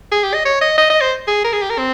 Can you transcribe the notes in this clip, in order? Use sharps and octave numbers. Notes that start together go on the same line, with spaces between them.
G#4
G4
D#5
C#5
D#5
D#5
D#5
C5
G#4
A#4
G#4
G4
A#4
C4